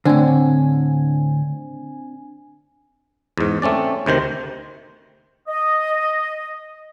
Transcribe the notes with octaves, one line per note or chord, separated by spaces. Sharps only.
A2 D3 C4 D4 G#5
E2 G#2
A3 C4 C#4 D5
D2 C3 D#3 C5
D#5